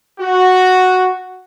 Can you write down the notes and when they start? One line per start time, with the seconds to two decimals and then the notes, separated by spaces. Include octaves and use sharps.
0.21 F#4